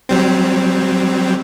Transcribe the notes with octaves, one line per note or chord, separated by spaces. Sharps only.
F#3 G3 C4